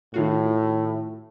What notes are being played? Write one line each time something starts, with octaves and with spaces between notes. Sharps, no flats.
A2 D#3 F4 F#4